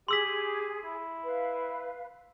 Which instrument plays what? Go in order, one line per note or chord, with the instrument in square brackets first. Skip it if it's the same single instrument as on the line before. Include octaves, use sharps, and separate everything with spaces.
[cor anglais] G4 [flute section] G#4 [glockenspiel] C6 E6 B6
[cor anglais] E4
[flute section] B4 F5